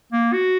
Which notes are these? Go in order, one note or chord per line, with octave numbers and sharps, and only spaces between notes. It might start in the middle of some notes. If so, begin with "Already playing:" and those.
A#3
F#4